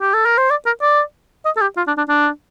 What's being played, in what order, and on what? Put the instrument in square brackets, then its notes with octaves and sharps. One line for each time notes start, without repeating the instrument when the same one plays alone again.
[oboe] G4
A4
A#4
C5
D5
A#4
D5
D#5
A4
G4
F4
D4
D4
D4